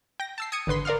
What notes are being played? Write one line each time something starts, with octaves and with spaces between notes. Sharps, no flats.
G5 A#6
A5 E6 C7
D#6 G#6 C#7 D#7
G#1 D3 B4 C6 B6
A#4 D5 F5 C6 F6